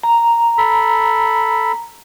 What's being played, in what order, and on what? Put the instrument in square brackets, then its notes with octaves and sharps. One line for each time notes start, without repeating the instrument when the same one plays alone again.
[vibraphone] A#5
[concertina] A4 B5